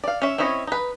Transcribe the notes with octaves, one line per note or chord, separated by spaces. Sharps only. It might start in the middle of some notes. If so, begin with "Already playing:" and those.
D5 F5
C#4 E5
C4 C#4 E4 C#5 D#5
D#4 B4